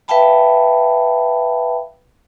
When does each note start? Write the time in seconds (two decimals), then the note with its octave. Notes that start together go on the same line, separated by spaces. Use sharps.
0.08 B4 E5 F5 G5 A5 B5